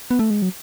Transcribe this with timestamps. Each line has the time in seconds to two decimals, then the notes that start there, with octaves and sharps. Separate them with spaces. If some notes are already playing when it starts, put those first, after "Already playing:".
0.11 B3
0.19 A3
0.30 G#3
0.42 F#3